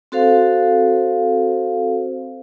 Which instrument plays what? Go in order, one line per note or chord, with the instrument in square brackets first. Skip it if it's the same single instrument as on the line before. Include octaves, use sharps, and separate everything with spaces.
[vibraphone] C4 F#4 A4 C5 F5